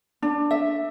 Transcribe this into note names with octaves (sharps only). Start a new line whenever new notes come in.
D4
E5